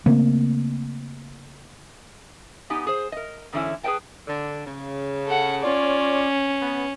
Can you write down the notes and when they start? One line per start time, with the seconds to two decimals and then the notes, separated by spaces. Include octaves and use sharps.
0.06 C#3 A3 A#3 C4
2.70 B3 D#4 G4 G#5
2.87 G#4 C5
3.12 A#4 D#5
3.53 G#2 D3 E3 F#3 C#4 E4
3.83 G#4 B4 C5 D#5 G5 A5
4.27 D3
4.66 C#3
5.27 A4 F#5
5.63 C#4 F4 C#5 D5
6.61 B3